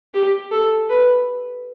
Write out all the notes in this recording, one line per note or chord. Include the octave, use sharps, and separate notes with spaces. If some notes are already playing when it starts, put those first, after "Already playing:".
G4
A4
B4